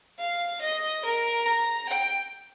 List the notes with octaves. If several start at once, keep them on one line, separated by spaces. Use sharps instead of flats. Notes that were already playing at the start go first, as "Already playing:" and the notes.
F5
D#5
A#4
A#5
G5